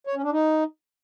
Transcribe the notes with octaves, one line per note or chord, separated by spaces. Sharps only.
C#5
C#4
D4
D#4